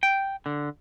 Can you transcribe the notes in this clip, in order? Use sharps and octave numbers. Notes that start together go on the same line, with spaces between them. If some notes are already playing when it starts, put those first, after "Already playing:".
G5
D3